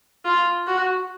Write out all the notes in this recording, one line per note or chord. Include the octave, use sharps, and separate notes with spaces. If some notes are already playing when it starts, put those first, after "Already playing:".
F4
F#4